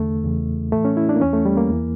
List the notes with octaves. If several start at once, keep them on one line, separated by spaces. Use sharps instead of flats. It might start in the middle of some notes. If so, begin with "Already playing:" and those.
Already playing: E2 D3 A3
E2 C#3 E3
A2 E3 A3
C#4
E4
D4
A#3
E2 E3 C#4
A3
G3
A#3
E2 E3